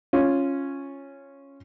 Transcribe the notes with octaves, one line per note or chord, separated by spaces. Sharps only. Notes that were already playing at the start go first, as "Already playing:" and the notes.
C#4 F4